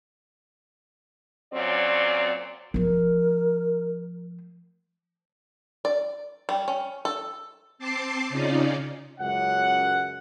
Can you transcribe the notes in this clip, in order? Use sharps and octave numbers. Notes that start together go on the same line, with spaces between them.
A#2 F#3 C4 C#4 D5
F3 A3 A#4
D5
G3
C#4
A4
C4 A5 C6 D6 C7
C#3 C#4 D#4 F4 D5
C#2 F#2 F#5